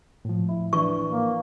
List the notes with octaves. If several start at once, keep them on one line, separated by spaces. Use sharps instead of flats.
A2 F3
E4
E3 D4 C#6
A#3